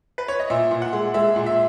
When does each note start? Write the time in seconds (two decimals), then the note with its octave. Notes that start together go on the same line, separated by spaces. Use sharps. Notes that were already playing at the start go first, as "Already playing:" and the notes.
0.18 B4
0.28 C#5
0.40 D#5
0.50 A#2 E5
0.71 A#2
0.82 F#5
0.93 G#3
1.14 G#3 E5
1.36 A#2
1.46 E5